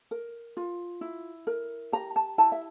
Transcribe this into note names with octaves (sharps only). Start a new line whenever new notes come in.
A#4
F4
E4
A#4
G4 A#5
A5
E4 A5
E5